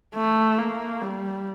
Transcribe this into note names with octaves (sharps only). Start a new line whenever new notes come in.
A3
A#3
G3